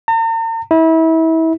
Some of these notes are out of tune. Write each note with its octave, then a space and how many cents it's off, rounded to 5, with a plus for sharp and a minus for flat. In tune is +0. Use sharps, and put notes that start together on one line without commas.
A#5 -45
E4 -30